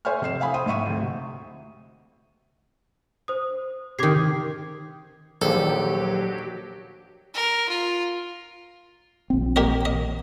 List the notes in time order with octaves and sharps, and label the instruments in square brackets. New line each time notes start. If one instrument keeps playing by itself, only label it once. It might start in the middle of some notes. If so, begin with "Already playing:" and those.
[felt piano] C5 E5 G#5 C#6 F6
C3 D#5 C7 E7
E5 F5 G#5 B5 D#6
C4 G5 C6 D#6 D#7
G#2 D#4 E5 C#6 D#7
D2 C3
[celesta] C5 D#6
[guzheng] C3 D#3 [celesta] D6 G#6 C7
[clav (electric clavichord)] A#1 D#2 [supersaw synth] F#3 G4 [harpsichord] A4
[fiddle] A#4
F4
[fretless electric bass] A#1 C4
[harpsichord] G4 A#4 D#5
D#5